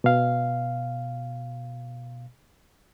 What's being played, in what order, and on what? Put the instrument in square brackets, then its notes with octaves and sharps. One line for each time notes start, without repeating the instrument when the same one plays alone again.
[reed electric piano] B2 F5